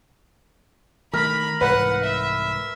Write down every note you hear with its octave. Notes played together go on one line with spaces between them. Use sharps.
D#3 A3 A#4 B5
C2 G#2 E3 B4 F#5
E5